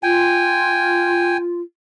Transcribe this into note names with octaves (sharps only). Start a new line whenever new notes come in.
F4 G5 G#5